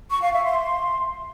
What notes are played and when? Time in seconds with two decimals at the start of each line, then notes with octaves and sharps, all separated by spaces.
0.10 C#6
0.22 F5
0.33 E5
0.45 C6